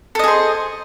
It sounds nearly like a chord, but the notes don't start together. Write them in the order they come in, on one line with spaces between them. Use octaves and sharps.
A4 D#5 G#4 C5